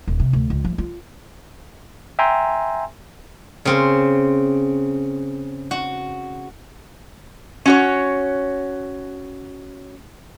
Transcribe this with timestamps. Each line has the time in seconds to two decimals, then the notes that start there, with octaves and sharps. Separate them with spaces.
0.07 D#1
0.20 C3
0.33 D2
0.50 C#2
0.65 F3
0.78 F4
2.19 E5 G5 G#5 A#5 C6
3.65 C#3 C4
5.71 F#4
7.66 C#4 F#4 C#5